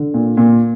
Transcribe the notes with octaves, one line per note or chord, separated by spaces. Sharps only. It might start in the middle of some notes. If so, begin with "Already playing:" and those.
Already playing: D3
A#2
A#2